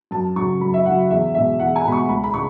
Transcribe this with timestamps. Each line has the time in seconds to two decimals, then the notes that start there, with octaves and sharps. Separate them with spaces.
0.11 F#2 A5
0.36 C#3 F#3 C#6
0.60 F#2 B5
0.74 E5
0.85 C#3 F#3 F#5
1.10 E2 E5
1.34 B2 G#3 E5
1.59 E2 F#5
1.76 G#5
1.85 B2 G#3 B5
1.92 C#6
2.09 C#2 B5
2.24 B5
2.34 C#3 G#3 C#6